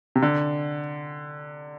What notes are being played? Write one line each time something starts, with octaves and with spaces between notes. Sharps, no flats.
C3
D3